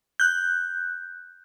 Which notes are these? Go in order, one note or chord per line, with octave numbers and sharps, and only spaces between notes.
F#6 G6